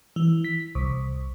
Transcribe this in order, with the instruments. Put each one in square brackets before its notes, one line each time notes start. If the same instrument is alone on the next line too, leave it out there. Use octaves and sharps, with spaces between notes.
[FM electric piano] E3
B6
C2